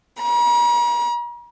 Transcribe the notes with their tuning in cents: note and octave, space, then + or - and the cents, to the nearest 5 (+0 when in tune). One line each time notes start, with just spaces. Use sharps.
A#5 +45